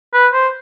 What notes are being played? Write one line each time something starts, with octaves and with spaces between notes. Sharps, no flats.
B4
C5